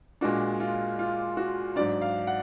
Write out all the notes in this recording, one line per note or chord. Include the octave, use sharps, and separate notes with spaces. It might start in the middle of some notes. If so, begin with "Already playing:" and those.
A#2 G#3 D4 F#4
F4
F4
F#4
G#2 F#3 D4 D5
F5
F#5